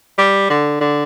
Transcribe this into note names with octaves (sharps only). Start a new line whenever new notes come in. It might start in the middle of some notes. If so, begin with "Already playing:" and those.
G3
D3
D3